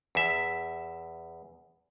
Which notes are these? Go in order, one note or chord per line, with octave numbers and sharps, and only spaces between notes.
E2 E5